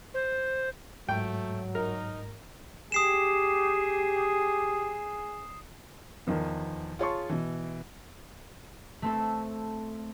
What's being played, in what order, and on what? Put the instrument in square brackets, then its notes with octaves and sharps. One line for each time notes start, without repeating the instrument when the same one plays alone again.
[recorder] C5
[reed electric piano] G#2 [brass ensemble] F#3 [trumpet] A3 [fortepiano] G5
[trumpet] D#4 [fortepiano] A#4
[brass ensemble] G4 [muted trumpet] G#4 [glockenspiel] D#6 C7 E7
[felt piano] E2 D#3 F3 B3
F4 G#4 C#5 A5 C6 C#6
B2 E3
[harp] A3 C4 A4